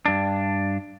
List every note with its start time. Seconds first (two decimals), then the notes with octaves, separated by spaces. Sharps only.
0.06 G2 D4